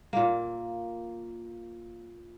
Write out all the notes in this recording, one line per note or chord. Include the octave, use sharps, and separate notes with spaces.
A#2 A#3